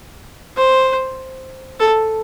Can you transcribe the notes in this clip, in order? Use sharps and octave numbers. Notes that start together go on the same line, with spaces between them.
C5
A4